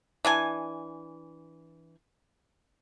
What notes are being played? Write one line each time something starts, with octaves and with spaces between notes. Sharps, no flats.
E3 D4 G#5